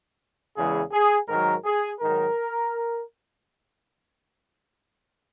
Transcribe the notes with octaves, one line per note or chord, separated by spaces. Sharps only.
E2 C#3 E3 G#3 G#4
G#4
G#2 D#3 F#3 A#4
G#4
G#2 D#3 F#3 A#4